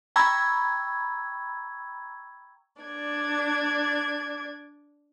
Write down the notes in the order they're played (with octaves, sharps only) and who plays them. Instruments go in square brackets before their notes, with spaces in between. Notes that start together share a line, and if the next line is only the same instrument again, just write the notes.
[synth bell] G5 A#5 B5 C#6 E6 G#6
[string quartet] D4 D5 G#6